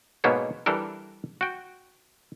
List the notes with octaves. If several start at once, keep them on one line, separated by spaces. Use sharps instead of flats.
G#2 B2 A#3 B3 C5 C#5
E3 G3 D4 A4 A#4
F#4 G5